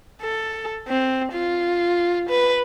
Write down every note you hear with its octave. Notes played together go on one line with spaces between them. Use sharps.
A4
C4
F4
B4